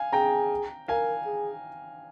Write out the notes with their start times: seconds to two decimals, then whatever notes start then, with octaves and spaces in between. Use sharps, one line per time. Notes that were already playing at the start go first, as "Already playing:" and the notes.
Already playing: F5 G#5
0.13 G#4 G5 A#5
0.88 A#4 F5 G#5
1.26 G#4